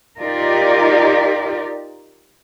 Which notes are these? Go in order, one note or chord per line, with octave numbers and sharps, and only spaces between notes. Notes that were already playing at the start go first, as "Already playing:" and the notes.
D#4 F4 G4 A#4 D5